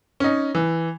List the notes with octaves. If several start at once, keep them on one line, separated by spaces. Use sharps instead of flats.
C#4 D#4
E3